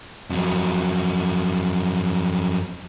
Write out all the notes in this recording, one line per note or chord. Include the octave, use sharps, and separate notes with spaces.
F2 F#3